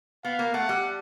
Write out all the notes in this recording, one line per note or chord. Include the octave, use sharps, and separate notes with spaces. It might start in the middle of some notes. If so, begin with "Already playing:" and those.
B3 F5
A#3
A3 F#5
G3